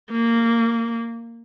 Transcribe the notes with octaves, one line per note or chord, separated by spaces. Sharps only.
A#3